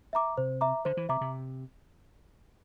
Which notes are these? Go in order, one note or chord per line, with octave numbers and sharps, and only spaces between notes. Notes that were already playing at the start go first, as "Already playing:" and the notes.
E5 A#5 D6
C3 C5
E5 A#5 D6
D3 C5
E3
C3 E5 A#5 D6
C3